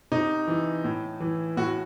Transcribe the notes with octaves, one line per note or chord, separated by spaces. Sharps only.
C3 D#4
E3
A2
E3
A2 F#4